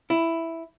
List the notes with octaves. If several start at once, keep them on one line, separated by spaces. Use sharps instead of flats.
E4